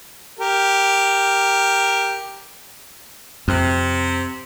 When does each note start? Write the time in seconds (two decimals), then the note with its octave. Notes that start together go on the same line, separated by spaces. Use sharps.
0.39 G4 A#4
3.48 F2 C3